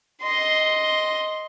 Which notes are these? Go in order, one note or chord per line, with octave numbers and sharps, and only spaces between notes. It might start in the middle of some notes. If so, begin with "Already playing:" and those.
D#5 C6